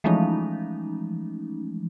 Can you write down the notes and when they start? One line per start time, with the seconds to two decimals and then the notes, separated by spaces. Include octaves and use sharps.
0.04 E3 F3 G#3 A3 C#4 D#4